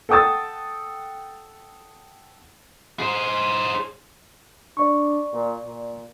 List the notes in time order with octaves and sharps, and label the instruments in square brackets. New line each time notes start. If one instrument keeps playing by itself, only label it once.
[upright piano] A4 F#5 G5 D#6 E6 A6
[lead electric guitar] G#4 C5
[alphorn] D4 [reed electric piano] D5 C#6
[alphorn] A#2
A#2